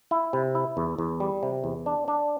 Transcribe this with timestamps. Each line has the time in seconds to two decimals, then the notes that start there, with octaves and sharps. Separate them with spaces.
0.11 E4
0.33 C3
0.55 E4
0.77 E2
0.99 E2
1.20 G3
1.43 C3
1.64 E2
1.86 D4
2.08 D4